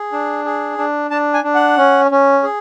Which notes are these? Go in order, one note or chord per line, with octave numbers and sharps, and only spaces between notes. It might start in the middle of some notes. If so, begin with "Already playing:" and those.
Already playing: G#4
D4
G#4
D4
D4 A5
G#5
D4
F#5
C#4
C#4
G#4